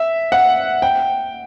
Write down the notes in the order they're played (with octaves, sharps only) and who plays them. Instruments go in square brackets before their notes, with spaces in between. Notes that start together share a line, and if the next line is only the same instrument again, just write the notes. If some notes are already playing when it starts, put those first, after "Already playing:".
Already playing: [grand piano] E5
F#5
G5